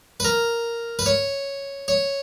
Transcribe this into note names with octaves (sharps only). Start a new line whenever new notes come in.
B4
A#4
B4
C#5
C#5